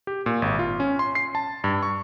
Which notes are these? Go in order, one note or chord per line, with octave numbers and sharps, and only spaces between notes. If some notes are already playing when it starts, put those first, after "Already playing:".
G4
A#2
G#1
F4
C#4
C6
C7
A5
G2
C#6